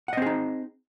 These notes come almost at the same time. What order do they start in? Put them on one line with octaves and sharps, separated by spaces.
F#5 D#5 C4 G#4 D#4